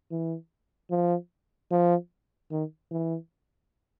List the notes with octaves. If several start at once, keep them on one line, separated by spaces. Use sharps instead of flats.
E3
F3
F3
D#3
E3